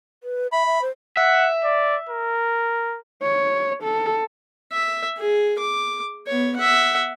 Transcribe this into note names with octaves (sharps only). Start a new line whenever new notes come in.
B4
E5 B5
E5
C5
E5 F#5
D5
A#4
C#5
A4
E5
G#4
D6
B3 C#5
E5 F#5